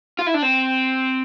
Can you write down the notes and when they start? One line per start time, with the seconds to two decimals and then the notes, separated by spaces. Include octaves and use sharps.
0.19 F4
0.26 E4
0.34 D4
0.42 C4